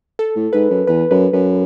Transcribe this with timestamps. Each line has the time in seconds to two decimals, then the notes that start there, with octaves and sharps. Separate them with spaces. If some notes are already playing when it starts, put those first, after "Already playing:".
0.19 A4
0.36 A2
0.53 G#2 B4
0.70 F#2
0.87 E2 B4
1.11 F#2 B4
1.33 F#2 B4